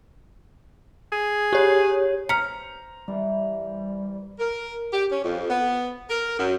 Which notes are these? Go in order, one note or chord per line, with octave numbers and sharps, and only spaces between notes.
G#4
G4 C#5
C5 A#5 F6 B6 C#7
E3 G3
A#4
G4
C#4
F2
B3
A#4
F#2